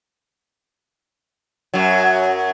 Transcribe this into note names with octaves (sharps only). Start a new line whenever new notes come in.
F#2 F#3